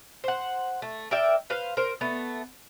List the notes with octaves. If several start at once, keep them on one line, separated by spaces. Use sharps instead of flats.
C5 F#5
A3
A#4 D5 E5 G5
B4 C5 F5
A#4 C5
A3 B3